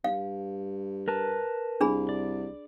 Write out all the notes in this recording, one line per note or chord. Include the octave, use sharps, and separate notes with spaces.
G2 F5
A#4 B4 A5
C2 D4 G#4 B5
D5